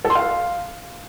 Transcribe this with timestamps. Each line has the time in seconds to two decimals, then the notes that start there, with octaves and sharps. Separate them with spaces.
0.05 A4
0.10 C6
0.15 F5